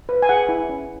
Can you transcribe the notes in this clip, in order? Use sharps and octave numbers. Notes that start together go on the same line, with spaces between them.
B4
G#5
G#4 F#5
E4
C#4